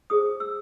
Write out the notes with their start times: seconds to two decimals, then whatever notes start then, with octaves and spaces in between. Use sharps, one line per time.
0.10 D#4 G#4 C5 D#6
0.40 E6